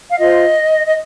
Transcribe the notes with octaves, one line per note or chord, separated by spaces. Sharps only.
F5
F4 C5 D#5
D#5